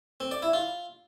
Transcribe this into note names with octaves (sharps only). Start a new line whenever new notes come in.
C4
D5
E4
F4